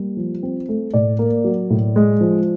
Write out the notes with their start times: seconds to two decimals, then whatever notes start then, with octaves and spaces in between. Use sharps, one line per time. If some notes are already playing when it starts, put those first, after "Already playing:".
Already playing: G3 A#3
0.17 F3
0.43 C4
0.69 A3
0.94 A2 D5
1.19 A#3
1.44 F#3
1.70 A2
1.96 G#3
2.21 F3